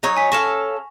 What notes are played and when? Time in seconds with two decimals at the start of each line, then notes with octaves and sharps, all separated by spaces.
0.03 F#3 D#4 C#5
0.17 G#5 B6
0.32 C#4 A4 F5 C#6 A#6 E7